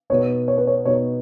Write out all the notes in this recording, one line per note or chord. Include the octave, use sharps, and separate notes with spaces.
B2 B3 D#4 C#5
C#5
B4
C#5
B2 B3 D#4 C#5